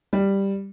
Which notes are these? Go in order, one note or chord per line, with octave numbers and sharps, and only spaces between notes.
G3